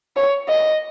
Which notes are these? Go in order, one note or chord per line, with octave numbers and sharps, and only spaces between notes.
C#5
D#5